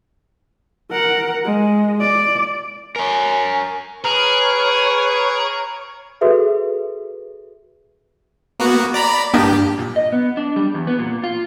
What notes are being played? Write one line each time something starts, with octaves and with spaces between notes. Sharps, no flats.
A#4 F#5
G#3
D5
A#4 C#5 G#5
G#4 B4 C#5 A#5 F6 D7
F#4 G#4 A4 B4 E5
A#3 B3 F#4
D5 A#5 B5
G2 A#3 D4 G4
A#2
D#5
B3
D4
G3
E2
B3
A#2
F4